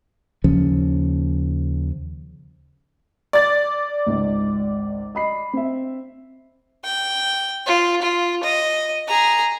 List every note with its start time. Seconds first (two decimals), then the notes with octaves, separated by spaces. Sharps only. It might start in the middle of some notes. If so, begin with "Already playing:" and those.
0.44 D#2 C#3 F3 C#4
3.33 D5 A6
4.07 G#1 C#2
5.15 D#5 B5 C7
5.53 C4 E5
6.84 G5
7.66 F4
8.02 F4
8.43 D#5
9.08 G#4 A#5